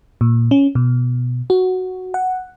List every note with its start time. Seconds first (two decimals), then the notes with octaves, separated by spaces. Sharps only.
0.21 A#2
0.51 C#4
0.75 B2
1.50 F#4
2.14 F#5